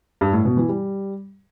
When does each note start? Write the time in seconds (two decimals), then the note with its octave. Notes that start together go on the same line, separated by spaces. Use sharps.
0.21 G2
0.33 A2
0.45 B2
0.57 E3
0.69 G3